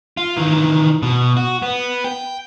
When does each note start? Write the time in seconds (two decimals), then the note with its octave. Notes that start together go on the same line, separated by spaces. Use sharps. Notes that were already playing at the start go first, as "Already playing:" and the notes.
0.17 F4
0.37 D#3 E3
1.03 B2
1.37 F#4
1.62 B3
2.05 G5